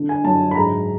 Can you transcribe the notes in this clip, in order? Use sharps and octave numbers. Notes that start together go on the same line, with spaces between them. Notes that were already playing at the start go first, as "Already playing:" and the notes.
Already playing: D3
G#5
F#2 A5
B5
G#2 A#5